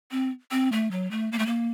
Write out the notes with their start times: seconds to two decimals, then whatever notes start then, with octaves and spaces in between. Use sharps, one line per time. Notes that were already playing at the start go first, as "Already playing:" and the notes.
0.11 C4
0.51 C4
0.72 A3
0.91 F#3
1.11 A3
1.32 A#3
1.39 A3
1.46 A#3